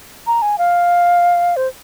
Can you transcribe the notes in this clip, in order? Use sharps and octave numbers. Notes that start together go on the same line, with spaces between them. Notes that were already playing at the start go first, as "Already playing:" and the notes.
A#5
G#5
F5
C5